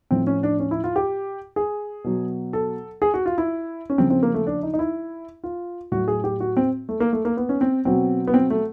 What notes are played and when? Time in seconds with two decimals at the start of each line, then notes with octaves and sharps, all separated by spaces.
0.11 A2 F3 C4
0.27 C#4
0.43 D4
0.60 C#4
0.71 E4
0.84 F4
0.96 G4
1.56 G#4
2.04 B2 F#3
2.53 A4
3.02 G#4
3.14 F#4
3.26 F4
3.38 E4
3.90 C#4
3.98 C#3 F3 C4
4.10 C4
4.23 A#3
4.34 A3
4.47 D4
4.63 D#4
4.74 D#4
4.79 E4
5.44 F4
5.92 A2 F#3 F#4
6.08 G#4
6.24 G4
6.40 F#4
6.57 C4
6.89 A3
7.00 A#3
7.13 A3
7.25 A#3
7.37 B3
7.49 C#4
7.61 C4
7.85 B2 F#3 C4
8.27 B3
8.34 C4
8.50 A3